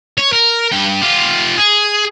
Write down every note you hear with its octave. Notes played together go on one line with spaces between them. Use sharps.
C#5
A#4
G2 G5
F4 G4
G#4